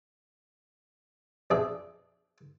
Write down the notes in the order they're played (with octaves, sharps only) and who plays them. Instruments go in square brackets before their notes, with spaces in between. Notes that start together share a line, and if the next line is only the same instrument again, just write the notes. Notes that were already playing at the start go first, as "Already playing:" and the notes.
[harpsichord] F2 B2 D4 G#4 E5